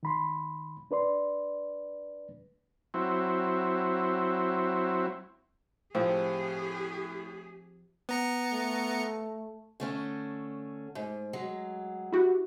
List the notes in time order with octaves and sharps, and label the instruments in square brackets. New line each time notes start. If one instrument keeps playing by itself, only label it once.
[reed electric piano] D#3 B5 C6
D4 B4 D5 C6
[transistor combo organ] F#3 C4 E4
[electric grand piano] A2 [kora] F3 C4 [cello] G4 G#4
[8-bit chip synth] B3 A#5 C#7
[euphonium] A3
[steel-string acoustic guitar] D3 A3 C#4
G#2
F#3 G#3
[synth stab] E4 F#4 G4